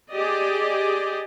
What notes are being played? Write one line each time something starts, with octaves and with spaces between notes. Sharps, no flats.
G4 G#4 D5 D#5